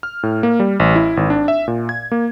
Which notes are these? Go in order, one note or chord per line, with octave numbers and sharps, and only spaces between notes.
F6
A2
A#3
G3
A1
E4
G#1
D4
E5
A#2
G#6
A#3